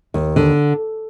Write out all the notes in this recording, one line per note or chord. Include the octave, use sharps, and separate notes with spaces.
D#2
D3